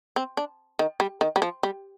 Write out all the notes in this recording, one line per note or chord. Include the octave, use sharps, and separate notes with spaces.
C4
D4
D#3
G3
D#3
G3
F3
G3